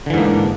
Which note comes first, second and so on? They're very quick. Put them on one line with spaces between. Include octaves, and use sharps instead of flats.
D3 E3 G#2 A#3 D4